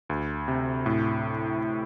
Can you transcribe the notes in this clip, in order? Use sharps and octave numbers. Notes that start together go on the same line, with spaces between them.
D2
C3
A2